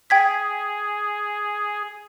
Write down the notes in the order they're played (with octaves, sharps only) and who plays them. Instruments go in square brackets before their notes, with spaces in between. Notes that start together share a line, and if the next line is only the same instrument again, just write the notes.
[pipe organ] G#4 [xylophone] G5 G#6 B6